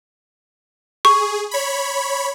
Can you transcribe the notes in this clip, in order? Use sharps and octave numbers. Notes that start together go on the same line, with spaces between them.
G#4 C#6
C#5 B5